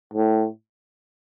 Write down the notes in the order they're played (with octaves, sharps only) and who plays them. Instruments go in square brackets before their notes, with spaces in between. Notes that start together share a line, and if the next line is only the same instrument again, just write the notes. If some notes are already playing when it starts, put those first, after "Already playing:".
[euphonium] A2